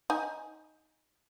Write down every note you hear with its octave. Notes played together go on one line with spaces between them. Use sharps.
D#4 G#5